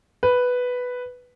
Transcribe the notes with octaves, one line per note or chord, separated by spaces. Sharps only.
B4